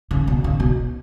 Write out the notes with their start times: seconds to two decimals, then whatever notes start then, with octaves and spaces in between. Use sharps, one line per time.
0.11 C#3
0.27 B2
0.44 C#3
0.60 B2